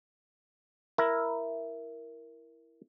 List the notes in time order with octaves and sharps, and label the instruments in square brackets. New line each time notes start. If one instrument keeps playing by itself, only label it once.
[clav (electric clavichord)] E4 A#4